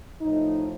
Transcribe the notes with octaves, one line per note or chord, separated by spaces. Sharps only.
A2 F3 A3 D#4